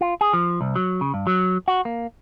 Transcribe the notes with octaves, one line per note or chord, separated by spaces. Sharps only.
F4
G#4
F3
C2
F#3
C#3
G2
F#3
F#4
A#3